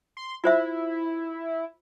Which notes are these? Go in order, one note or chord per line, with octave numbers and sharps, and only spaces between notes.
C6
E4 F4 C5 E5